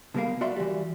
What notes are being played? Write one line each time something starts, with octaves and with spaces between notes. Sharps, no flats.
B2 G3 A#3 A#4 F5
F#4 D5 E5 F5 C6
E3 G3